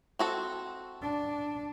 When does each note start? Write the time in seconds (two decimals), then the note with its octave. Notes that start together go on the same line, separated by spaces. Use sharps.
0.19 C4 F#4 A4
1.02 D4